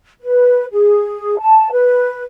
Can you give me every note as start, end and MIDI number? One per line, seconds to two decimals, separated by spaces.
0.22 0.65 71
0.72 1.38 68
1.39 1.69 81
1.73 2.23 71